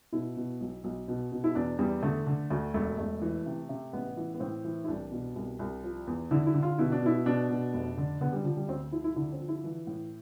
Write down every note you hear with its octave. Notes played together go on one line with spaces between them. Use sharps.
B2 E4
B2
B1
B1
B2
B2
E4
E2 D4
E2 G3
D3 A3
D3
D2 A3
E1 A3
E1 A3
E3
C3
C3
A1 B3
E3
B3
A2 C4
E3
E4
C2 D4
B2
C2
C2
F3
E2
D3 E4
E4
D3
F4
B2 E4
D4
B2 E4
B2 D4
B2
F1
D3
D3 B3
G3
D3 F3
G3
D2 C4
F3 E4
E4
D3 E4
C4
F3
E4
E3
A2